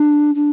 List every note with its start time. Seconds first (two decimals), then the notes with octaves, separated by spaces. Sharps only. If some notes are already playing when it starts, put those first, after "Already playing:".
Already playing: D4
0.34 D4